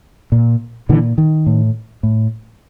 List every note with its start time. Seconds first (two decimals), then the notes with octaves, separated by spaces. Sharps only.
0.32 A#2
0.89 A#2 D3 E3
1.18 D#3
1.47 A2
2.03 A2